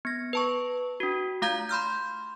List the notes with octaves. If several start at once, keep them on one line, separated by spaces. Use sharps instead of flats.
B3 A#6
B4 A5 C#6
D4 F#4
A3 F4 F5 A#5 G6 G#6
B5 C6 F6 G6